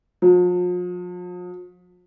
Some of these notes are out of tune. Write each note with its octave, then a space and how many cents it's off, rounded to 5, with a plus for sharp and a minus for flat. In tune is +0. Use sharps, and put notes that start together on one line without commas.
F3 +40